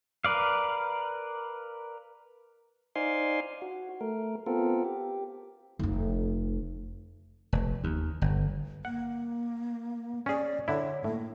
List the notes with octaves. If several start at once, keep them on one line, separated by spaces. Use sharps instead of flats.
A#4 B4 D5 F5
D#4 C5 D5 F5 G#5 C6
F#4
A3 A#4
B3 C4 F4 A4 A#4
G4
F1 F2
F1
D#2
G1
A#3 F#5
C#4 G#4 D5
D3 E4 C#5
A2 A#3